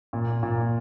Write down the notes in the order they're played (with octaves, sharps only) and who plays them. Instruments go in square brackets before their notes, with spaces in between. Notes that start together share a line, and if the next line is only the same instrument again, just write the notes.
[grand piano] A#2
A#2